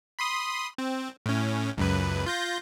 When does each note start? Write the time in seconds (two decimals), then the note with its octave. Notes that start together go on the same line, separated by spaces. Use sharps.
0.19 B5 C6 D#6
0.78 C4
1.26 A2 C#4
1.77 C#2 F#2 B4
2.26 F4 G6 A#6